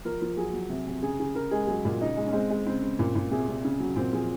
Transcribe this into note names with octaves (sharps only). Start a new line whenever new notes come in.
F3 A#4
F3
F#3 G#4
F#3
C3
C3
C#3 G#4
C#3 G#4
C#3 A#4
G#3 G#4
F#3 G#4
A#2 F4
C#3 D#4
G#3
C#4
G#3 C4
G#3
C#3 C4
C#3
A#2
A#2
C3 G#4
C3
C#3
F#3
A#2 C4
F3 G#4